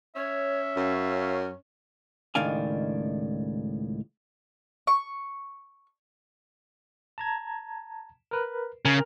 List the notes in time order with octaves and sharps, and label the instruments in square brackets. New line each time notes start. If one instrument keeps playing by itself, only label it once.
[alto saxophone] C#4 [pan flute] C#5 [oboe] E5
[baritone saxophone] F#2 [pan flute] F5
[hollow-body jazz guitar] C#2 A2 D#3 D4 F5 G#5
[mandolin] C#6
[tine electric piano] A5 A#5 G#6
A#4 B4
[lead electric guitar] C#3 [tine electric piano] A#4